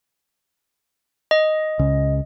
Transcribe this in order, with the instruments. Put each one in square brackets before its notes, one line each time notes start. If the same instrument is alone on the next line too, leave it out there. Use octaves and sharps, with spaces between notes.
[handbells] D#5
[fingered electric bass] C#2 C#3